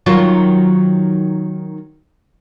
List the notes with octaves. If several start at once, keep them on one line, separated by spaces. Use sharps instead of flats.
D#3 F#3 F4